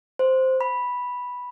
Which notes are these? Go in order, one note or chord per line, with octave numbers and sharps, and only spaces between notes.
C5
B5